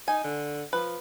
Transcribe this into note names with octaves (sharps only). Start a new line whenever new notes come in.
D#4 G#5
D3
F3 B4